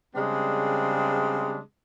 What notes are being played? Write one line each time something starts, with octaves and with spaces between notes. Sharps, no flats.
C#3 G3 G#3 C4 D4